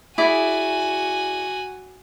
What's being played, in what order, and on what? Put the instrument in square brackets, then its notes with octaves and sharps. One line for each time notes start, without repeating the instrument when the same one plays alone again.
[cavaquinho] E4 G#4 D5 [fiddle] F#4 G#5